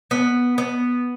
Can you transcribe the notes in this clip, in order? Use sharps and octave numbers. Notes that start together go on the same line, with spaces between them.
B3
B3